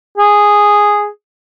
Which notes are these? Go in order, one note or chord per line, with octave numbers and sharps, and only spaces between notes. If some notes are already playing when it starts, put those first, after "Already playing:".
G#4